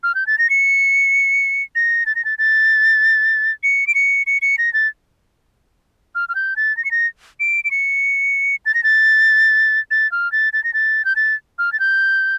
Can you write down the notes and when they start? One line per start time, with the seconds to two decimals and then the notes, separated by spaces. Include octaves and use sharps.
0.03 F6
0.15 G6
0.27 A6
0.38 A#6
0.50 C#7
1.75 A#6
2.06 A6
2.16 A#6
2.25 A6
2.38 A6
3.63 C#7
3.87 D7
3.95 C#7
4.27 C#7
4.42 C#7
4.58 A#6
4.74 A6
6.15 F6
6.29 F6
6.35 G6
6.56 A6
6.77 A#6
6.85 C#7
6.91 A#6
7.40 D7
7.64 D7
7.71 C#7
8.66 A6
8.74 A#6
8.84 A6
9.91 A6
10.12 F6
10.32 A6
10.53 A6
10.64 A#6
10.74 A6
11.05 G6
11.16 A6
11.59 F6
11.73 A6
11.80 G6